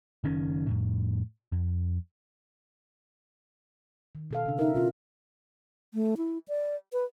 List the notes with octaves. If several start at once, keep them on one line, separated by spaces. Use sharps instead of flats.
F#1 D#3 C#4
F2 A2
F2
D#3
B2 A4 F5
C#3 D4
D#4 A#4 E5
B2 C#4 E4 F4
A3
E4
D5
B4